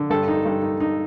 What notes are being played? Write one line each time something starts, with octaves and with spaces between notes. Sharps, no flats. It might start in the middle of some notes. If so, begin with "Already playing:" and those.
Already playing: D3
G2 A4
D#4
G2
D#4
D#4